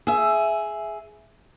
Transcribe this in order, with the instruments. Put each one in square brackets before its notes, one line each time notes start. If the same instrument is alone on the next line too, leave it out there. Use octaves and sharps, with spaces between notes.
[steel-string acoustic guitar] G#4 E5